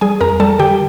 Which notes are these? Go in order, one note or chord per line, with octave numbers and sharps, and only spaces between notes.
G3 G#4 G#5
F2 A#4 A#5
G3 A4 A5
D3 G4 G5